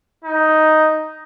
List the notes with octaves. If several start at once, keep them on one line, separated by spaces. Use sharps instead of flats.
D#4